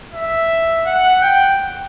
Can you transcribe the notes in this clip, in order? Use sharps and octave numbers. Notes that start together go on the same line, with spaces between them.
E5
F#5
G5